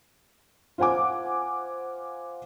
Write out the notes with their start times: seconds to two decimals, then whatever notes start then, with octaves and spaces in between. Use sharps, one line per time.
0.78 F4 C5 F#5 G#5 D6